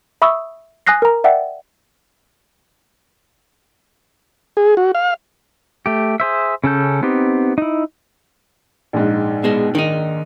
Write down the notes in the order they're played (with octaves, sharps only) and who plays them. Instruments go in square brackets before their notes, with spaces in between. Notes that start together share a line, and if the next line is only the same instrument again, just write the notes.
[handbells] E5 B5 C#6 D#6 E6
G#5 D#6 F#6 A#6 C7
A#4 A#5
D5 E5 F#5 G5
[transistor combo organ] G#4
F#4
F5
[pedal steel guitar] A3 G4
G#4 C5 E5
C#3 C#4 A4 G6
B3 C4 D#4 G4
D#4 E4
[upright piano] A#1 G#2
[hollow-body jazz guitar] B2 G#3
D#3 D#4